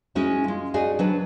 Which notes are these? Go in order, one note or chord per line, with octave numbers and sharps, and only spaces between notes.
G#3 C#4 D#4 E4 F#4
G#3 F4
D#4 F#4 G#4 D5 D#5
F#3 D4 B4